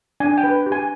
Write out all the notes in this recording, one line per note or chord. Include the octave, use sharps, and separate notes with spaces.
D4 G#5
G5
B4
G4
G#5